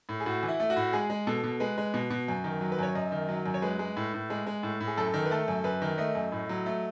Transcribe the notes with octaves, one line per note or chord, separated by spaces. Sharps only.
A2
G#4
A2 F#4
E3
E4
A3
F#4
A2
G#3 G#4
G#3
B2 A4
B2
G#3 B4
G#3
B2
B2
F#2
D#3
F#3
B4
F#2 C#5
F#2 D#5
D#3
F#3
F#2
C#5
G#3 B4
G#3
A2
A2
G#3
G#3
A2
A2
G#4
F#2 A4
D#3
B4
A3 A4
F#2
F#2 B4
D#3
A3 D#5
F#2
A2
F#3
A3